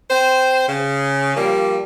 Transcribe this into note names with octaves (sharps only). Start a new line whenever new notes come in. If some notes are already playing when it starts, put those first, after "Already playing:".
C4 C5
C#3
F3 G3 A#3